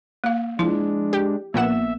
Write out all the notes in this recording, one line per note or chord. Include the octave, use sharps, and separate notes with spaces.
A#3 F5
F3 G#3 D4 E4
G4
A#1 A#2 A#3 B3 E5 F#5 E7